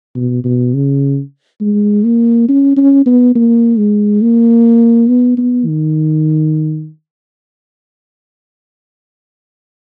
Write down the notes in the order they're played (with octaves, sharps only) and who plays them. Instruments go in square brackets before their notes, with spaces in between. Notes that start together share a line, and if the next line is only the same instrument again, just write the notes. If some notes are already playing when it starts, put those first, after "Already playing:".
[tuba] B2
B2
C#3
G#3
A#3
C#4
C#4
B3
A#3
G#3
A#3
B3
B3
D#3